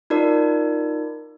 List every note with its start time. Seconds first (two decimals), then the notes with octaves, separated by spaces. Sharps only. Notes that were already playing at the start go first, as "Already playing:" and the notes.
0.10 D#4 F4 A#4 D5